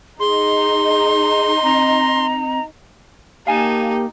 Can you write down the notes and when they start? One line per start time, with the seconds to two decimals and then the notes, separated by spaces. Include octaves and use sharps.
0.20 D#4 G#4 C6
1.63 C4 A#5
3.47 A#3 D#4 G4 F5 G#5 A5